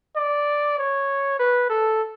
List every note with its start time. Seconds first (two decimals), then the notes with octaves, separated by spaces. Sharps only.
0.16 D5
0.79 C#5
1.39 B4
1.70 A4